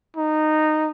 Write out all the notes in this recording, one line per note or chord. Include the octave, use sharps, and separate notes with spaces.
D#4